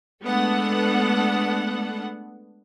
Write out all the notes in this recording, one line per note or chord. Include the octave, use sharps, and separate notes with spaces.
G#3 A3 B3 D4 A4 F#5